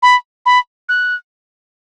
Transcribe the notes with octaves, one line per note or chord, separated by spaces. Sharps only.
B5
B5
F#6